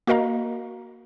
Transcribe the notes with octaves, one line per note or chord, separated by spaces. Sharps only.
A#3 F#4 A#4 D#5 F5 A#5